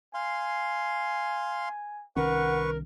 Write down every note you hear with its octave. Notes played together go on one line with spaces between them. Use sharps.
F5 G#5 C6
C2 D#3 C#4 A#4 B4 F#5 C#6